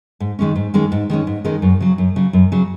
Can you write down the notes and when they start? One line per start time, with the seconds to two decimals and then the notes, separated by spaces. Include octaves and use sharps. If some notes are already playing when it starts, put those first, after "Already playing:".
0.20 G#2
0.39 D#3 G#3 C#4
0.56 G#2
0.74 D#3 G#3 C#4
0.92 G#2
1.10 D#3 G#3 C#4
1.27 G#2
1.44 D#3 G#3 C#4
1.62 F#2
1.80 C#3 F#3
1.98 F#2
2.16 C#3 F#3
2.33 F#2
2.52 C#3 F#3